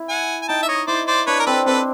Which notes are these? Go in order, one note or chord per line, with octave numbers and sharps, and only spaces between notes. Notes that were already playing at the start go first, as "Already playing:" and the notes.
Already playing: E4
F#5 G#5
G#5
D#4 G5 A5
E5
C#5 D#5
E4 C5 D5
C5 D5
D4 B4 C#5
A#4
C4 A4 B4
C4 A4 B4